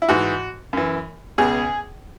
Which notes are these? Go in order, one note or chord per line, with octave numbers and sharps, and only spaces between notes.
E4
G#2 E3 F#4
F#2 E3
C#2 B2 G#4